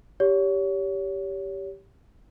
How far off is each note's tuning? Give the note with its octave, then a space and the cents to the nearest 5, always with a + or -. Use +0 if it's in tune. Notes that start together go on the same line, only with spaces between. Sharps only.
G4 +0 C#5 +30